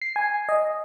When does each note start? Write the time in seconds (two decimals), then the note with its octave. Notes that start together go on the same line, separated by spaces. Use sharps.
0.02 C7
0.16 G#5
0.49 D#5